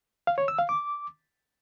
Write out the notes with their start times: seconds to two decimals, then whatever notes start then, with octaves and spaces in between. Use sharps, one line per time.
0.27 F5
0.38 C#5
0.48 E6
0.59 F5
0.69 D6